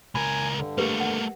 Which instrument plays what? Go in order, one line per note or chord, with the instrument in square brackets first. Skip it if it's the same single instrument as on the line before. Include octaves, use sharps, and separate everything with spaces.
[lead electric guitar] C#2 A#4 [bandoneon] G#5 [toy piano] B5
[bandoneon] G2 D3
[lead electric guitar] A3 A#3 [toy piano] G4 A#4 B4
[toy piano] F#5